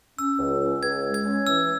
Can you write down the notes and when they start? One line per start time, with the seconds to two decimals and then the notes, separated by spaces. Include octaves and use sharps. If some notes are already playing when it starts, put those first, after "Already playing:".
0.18 C#4 E6
0.39 C#2
0.61 C#4
0.82 C#2 G#6
1.05 G#3
1.14 G#6
1.26 C#4
1.46 E3 E6